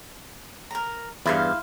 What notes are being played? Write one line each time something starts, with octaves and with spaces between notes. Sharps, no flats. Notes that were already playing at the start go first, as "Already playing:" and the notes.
A#4 A#5
E2 G2 E4 C5 F5